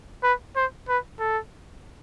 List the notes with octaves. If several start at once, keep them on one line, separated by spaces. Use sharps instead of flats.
B4
C5
B4
A4